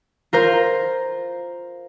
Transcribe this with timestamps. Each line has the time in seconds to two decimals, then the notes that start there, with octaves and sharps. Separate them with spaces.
0.33 F4 A#4 C5